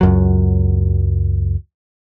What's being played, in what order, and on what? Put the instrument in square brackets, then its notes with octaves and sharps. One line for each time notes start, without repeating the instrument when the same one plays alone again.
[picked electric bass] C#2 F#2 F#3